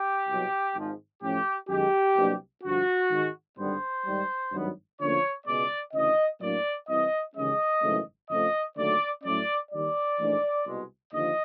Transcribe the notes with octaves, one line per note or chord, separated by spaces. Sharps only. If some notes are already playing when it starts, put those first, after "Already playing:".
Already playing: G4
C2 B2 F#3
G#1 G#2 F3
A2 F3 A3 C#4 G4
F#2 D#3 G#3 G4
C2 B2 F#3 A#3 D4
G2 D3 F3 F#4
G#2 D#3 G#3
G#1 G2 D3 G3 B3 C5
G#2 D#3 G3
G#1 G2 D#3 F#3 B3
D2 D3 F3 A#3 C#4 C#5
C#2 B2 G#3 B3 D5
D2 C#3 E3 D#5
A2 F#3 A#3 D4 D5
C2 C3 E3 D#5
D#2 C#3 E3 G#3 C#4 D#5
G#1 F#2 C#3 E3 A3
F2 C#3 F3 A3 D#5
D#2 D3 F#3 A3 D5
A2 F#3 A3 C#4 D5
D#2 D#3 G3 D5
A#1 G#2 E3 A3 D4
C2 B2 G#3
D#2 D3 F3 D#5